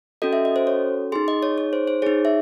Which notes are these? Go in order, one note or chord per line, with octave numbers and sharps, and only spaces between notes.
C#4 F#4 A4 D#5
E5
D#5
C5
C#5
D#4 G#4 C6
D#5
C#5
C#5
C5
C5
D#4 G#4 C#5
E5